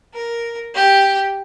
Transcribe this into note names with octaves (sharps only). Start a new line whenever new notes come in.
A#4
G4